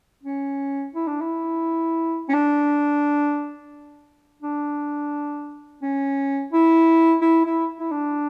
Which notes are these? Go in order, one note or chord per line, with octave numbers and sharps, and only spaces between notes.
C#4
E4
D4
E4
C#4
D4
D4
C#4
E4
E4
E4
E4
D4